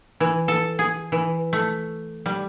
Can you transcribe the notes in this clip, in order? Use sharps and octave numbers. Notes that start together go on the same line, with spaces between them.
E3
A4
G#4
E3
A3
G3